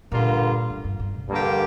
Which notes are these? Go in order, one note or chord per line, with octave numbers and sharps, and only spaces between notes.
G2 A#2 D3 A#3 F4
G2
G2
G2
C3
G2 D3 F3 A#3 G4